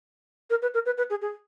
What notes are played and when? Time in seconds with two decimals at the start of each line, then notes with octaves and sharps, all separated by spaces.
0.50 A#4
0.62 B4
0.74 A#4
0.86 B4
0.97 B4
1.10 G#4
1.21 G#4